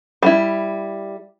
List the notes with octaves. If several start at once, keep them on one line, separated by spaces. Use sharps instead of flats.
G3 E4